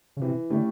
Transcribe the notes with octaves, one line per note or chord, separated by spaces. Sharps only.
C#3
C3 E3
D3 A3 C#4 E4 G4